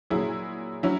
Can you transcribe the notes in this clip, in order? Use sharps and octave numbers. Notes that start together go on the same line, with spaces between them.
A#2 F#3 E4 G#4
F#3 C#4 E4